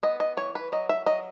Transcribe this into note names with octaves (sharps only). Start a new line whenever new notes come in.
B3 D#5
D#5
E3 C#5
B4
F#3 D#5
E5
F#3 D#5